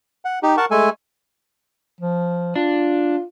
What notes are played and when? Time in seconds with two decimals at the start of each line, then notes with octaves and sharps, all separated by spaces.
0.25 F#5
0.43 D#4 G4
0.57 A#4 F#5 A5 C#6
0.71 G#3 A3 A4 G#5
2.01 F3
2.56 D4 F4